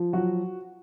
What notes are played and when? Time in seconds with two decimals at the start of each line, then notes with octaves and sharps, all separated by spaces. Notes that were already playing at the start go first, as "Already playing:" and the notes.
Already playing: F3
0.13 F#3 F#4